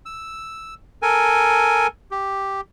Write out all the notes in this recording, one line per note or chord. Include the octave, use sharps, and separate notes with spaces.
E6
A4 A#4 G#5
G4